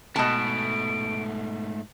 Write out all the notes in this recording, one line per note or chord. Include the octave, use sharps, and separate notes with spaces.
G#2 B2 A3 A5 D7